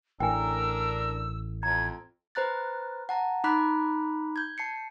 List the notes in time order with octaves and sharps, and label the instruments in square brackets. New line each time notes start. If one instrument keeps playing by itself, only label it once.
[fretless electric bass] A1 A2 [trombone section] D4 A#4 [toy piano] G5 G#5 [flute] E6
[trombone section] F2 [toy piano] A#5 [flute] G#6
[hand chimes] B4 C5 A#5 F#6 A6
F#5 A5 A#5
D#4 A#5 B5 D6 F#6 B6
G6 G#6
A5 C7 C#7